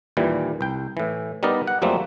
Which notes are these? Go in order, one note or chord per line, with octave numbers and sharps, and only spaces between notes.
D#2 A#2 E3 G3
C2 G5
A2 E3
G3 B3 D#4 A#4 D5 D#5
F#5
F2 F#3 G3 A3 A#3 C4